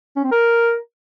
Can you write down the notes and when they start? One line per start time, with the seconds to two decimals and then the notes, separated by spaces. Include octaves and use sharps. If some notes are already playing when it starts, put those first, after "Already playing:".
0.16 C#4
0.24 C4
0.32 A#4